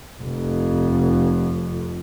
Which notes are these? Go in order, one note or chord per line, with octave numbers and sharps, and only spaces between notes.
F1 F2